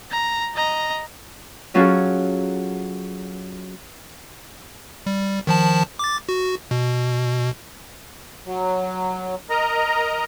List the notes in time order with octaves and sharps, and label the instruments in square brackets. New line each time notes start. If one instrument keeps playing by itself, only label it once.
[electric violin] A#5
D#5 A#5
[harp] F#3 C#4 F4 F#4 G#4 A4
[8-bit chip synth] G3
D#3 F3 A5
D6 A6
F#4
B2
[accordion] F#3
A#4 D#5 A#5